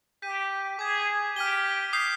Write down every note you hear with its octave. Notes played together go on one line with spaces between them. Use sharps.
G4 G6 B6 D#7
G#4 D6 G#6 B6
G4 F6 B6 D#7 G7
D#6 G6 C7